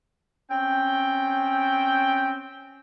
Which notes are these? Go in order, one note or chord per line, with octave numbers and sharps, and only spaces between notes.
C4 C#4 G5